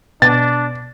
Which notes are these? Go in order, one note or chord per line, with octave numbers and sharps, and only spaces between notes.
B2 D4 A6